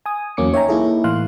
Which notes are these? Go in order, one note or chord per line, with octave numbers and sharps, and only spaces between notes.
G#5 D#6
E2 F#3 A#3 C#4 D6 C#7
D#4 C#5 E5 G5 G#5 A#5
A#3 D#4 E4 G#4 A4
A2 E3 F5 C6 F#6